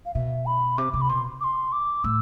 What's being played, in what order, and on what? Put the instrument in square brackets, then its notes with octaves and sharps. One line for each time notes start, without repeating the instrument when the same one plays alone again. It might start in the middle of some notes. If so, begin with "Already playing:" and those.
[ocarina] F5
[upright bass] B2 [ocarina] E5
[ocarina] B5
[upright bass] C3 [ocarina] D6
[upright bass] C3 [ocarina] D6
[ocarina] B5
[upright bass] B2 [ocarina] C6
[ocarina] D6
C6
D6
[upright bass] A2 [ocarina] E6